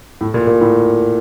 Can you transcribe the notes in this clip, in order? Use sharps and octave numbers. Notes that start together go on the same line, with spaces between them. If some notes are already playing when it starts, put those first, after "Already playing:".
A2
A#2
A#2
A2